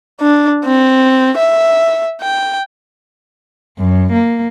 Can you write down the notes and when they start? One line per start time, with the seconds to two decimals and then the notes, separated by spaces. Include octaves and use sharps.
0.21 D4
0.65 C4
1.37 E5
2.21 G5
3.78 F#2
4.11 A#3